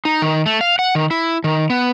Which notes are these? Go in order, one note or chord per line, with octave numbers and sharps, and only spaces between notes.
D#4
D#3
A3
F5
F#5
D#3
E4
D#3
B3